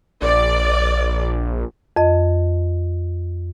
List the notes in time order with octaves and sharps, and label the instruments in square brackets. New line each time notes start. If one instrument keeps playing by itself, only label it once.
[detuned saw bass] A#1 [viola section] D5
[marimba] F2 D#5